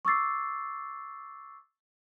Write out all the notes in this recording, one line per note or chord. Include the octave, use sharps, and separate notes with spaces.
C#6 D6 E6 A6 C7